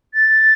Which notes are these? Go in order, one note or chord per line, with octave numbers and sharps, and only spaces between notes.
A6